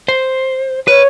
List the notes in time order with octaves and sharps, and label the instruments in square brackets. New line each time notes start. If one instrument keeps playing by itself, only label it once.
[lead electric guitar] C5
[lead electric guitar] B4 [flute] C#5